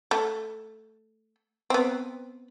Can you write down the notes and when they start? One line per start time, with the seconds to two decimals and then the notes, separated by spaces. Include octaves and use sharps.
0.11 A3
1.70 B3 C4